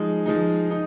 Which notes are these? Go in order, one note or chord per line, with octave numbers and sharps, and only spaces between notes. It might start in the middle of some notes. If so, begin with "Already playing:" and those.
Already playing: F3 G#3 D#4
F3 G#3 D#4
D#4